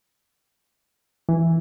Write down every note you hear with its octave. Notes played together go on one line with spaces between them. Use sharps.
E3